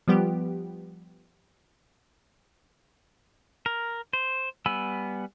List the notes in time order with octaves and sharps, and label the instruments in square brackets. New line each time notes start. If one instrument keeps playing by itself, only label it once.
[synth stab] F3 G3 B3 G4
[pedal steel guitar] A#4
C5
G3 B3 G#5 B5 E6